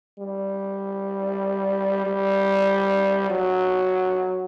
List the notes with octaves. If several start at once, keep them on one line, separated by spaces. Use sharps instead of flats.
G3
G3
F#3